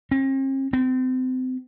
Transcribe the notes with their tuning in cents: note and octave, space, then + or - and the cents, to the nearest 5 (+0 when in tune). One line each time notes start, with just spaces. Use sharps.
C4 +45
C4 -30